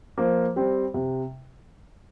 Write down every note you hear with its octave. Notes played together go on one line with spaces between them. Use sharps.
F3 A#3
G3 C4
C3